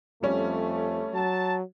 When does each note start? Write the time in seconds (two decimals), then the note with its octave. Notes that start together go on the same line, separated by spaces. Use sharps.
0.23 F2 G3 A3 C#4
1.14 F#3 A5